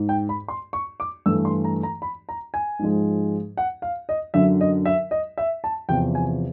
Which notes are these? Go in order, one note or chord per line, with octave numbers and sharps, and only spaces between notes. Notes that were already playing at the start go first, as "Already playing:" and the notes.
Already playing: G#2
G5
B5
C6
C#6
D6
G2 E3 A3 E6
C6
A#5
A#5
B5
A#5
G#5
G#2 F3 G#3
F#5
F5
D#5
F#2 D3 F#3 E5
D#5
E5
D#5
E5
A5
E2 C3 F3 G5
G#5